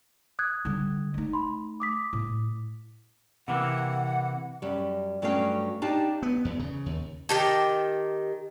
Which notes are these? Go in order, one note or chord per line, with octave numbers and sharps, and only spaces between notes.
D#6 F#6 G#6
D3 G3
A3 D#4
B5 C6
D6 D#6 B6
A2
C3 E3 A#3 F#5
F#2 G3
G2 F#3 A3 C#4 F5 G5
D4 D#4 G4 F5 A5
B3
E2
C#3
D#2
D#3 G4 A5